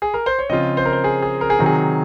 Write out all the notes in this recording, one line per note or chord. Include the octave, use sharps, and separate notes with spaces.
G#4
A#4
C5
C#5
C#3 F3 C4 F4 D#5
C5
A#4
C5
G#4
G#4
A#4
G#4
C3 D#3 F#3
G#4